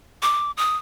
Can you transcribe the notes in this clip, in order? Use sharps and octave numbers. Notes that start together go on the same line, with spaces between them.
D6
D#6